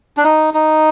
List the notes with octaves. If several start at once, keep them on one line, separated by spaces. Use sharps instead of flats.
D4
D#4
D#4